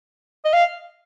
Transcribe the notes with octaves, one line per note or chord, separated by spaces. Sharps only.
D#5
F5